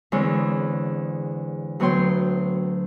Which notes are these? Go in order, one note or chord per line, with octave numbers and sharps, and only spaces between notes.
E2 D3 G#3 C4 C#5
D2 F#3 B3 C#5 G5 C6